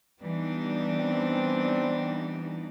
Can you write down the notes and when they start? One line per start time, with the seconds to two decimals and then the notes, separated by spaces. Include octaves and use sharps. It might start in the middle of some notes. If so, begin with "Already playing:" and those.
0.23 E3 G3 B3 D4 D#4 D5
0.97 C4